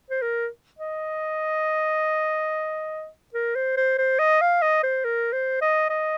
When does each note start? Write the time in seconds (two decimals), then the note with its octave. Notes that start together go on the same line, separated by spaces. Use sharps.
0.10 C5
0.22 A#4
0.79 D#5
3.34 A#4
3.55 C5
3.77 C5
3.98 C5
4.19 D#5
4.41 F5
4.62 D#5
4.83 C5
5.04 A#4
5.32 C5
5.61 D#5
5.90 D#5